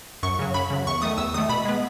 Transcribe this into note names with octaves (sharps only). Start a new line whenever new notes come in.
F#2 C#6
C#3 F#3
F#2 B5
C#3 F#3
E2 C#6
D#3 A3 D#6
E2 E6
D#3 A3 D#6
B2 B5
G#3 B3